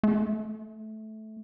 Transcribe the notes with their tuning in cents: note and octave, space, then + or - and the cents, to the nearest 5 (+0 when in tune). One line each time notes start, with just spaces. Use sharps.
A3 -15